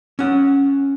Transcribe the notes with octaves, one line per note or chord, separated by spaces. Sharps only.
C#4 F#5